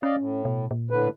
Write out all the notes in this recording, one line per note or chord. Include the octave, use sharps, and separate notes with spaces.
C#4 D5 D#5 F5
A2
B2
A#2
A2 D3 B4